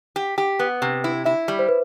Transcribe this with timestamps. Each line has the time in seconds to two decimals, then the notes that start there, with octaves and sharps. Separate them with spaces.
0.16 G4
0.38 G4
0.59 B3
0.82 C3
1.04 E4
1.25 E4 E5
1.48 G3
1.59 C5
1.69 B4